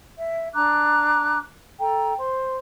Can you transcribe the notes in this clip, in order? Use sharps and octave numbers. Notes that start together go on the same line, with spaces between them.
E5
D4 A#5 D6 F#6
A4 G5 A#5
C5 C6